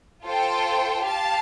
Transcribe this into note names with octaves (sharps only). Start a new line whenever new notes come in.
F4 A4 C5 G5
G4 F5 A5